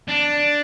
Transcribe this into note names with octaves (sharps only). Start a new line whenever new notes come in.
D4